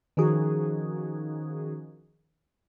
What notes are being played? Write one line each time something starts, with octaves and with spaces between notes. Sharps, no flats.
D#3 F3 C#4 D#4 F#4 G#4